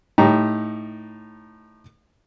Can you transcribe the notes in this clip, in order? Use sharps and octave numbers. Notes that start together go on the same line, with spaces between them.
A2 D#4 G4 A#5